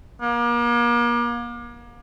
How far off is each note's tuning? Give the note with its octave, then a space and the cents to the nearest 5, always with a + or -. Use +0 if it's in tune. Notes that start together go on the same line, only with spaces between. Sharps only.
A#3 +35